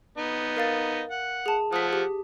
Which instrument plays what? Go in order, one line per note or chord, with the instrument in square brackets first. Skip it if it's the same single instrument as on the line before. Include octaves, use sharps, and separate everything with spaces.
[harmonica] B3 D#4
[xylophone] A#4 F5 A6
[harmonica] F#5
[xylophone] G#4 A5
[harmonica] F3 F#5 [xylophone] D#6 B6
[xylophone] G4